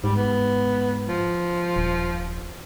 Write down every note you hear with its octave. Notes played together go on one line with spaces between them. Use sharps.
G#2 G3
B3
F3
D#1